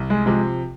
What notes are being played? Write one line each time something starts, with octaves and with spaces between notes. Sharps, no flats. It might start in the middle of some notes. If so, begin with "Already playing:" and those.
Already playing: C2
G#3
C3 F3 G#3